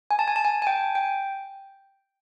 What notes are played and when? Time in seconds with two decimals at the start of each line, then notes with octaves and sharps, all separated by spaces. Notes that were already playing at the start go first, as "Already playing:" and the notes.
0.11 G#5
0.19 A5
0.28 G#5
0.36 A5
0.45 G#5
0.62 G#5
0.67 G5
0.95 G5